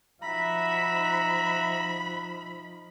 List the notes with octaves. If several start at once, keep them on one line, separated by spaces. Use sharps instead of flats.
F3 D#4 F#4 E5 A#5 B5